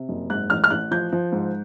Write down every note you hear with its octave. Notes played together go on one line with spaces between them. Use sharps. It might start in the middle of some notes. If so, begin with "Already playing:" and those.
Already playing: C3
F#1
G#2 F#6
A1 F6
F6
A1 F#6
F3 G6
F3
G#2